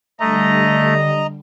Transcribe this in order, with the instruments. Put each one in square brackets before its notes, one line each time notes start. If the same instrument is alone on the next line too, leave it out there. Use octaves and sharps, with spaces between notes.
[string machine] D3 G3 [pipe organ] A3 [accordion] D#5 A#5